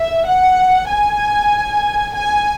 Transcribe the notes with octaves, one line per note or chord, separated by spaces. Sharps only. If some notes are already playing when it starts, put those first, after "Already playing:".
Already playing: E5
F#5
G#5
G#5